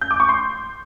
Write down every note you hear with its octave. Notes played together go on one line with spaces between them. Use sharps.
G6
D6
C#6
C6